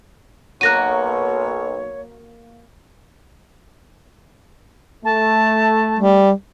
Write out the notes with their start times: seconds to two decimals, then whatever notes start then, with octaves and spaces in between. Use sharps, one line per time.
0.61 B1 A#3 F#4 C#5 F#6 A#6 D#7
5.05 A3 A5
5.99 G3